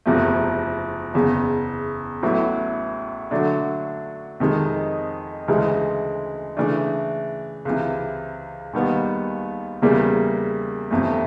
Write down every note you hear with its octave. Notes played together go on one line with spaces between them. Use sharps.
F#1 E2 C3 F3 A3
F#1 E2 C#3
A1 A2 F#3 B3 E4
D3 F#3 A3 D4
F2 C3 D#3 G#3
D2 C#3 E3 G#3
C#3 E3 A3 D4
C#2 C3 E3
D#2 D#3 G3 B3
E2 C#3 E3 G3 A#3
G1 F2 C3 E3 A3